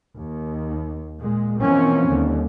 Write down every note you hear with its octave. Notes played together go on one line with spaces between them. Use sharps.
D#2
A#2 G#3
B2 E3 F3 A#3 C4 C#4
D#2 D3 G3